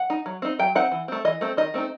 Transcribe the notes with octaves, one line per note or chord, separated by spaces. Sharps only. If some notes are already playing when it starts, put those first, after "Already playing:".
Already playing: F#5
D#4
F#3
C4 D#4
F#3 G5
C4 D#4 F#5
E3
A3 C4
E3 D#5
A3 C4
D#3 D#5
A3 C4 D#4